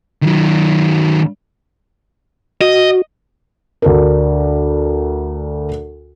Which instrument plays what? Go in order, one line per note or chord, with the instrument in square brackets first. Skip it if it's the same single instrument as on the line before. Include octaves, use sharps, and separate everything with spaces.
[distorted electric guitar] D#3 F#3
[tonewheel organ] F#4 [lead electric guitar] D#5
[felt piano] D2 D4 A#4